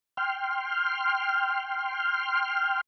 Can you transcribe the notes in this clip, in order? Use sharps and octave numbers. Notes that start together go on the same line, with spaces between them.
G5 C6 F6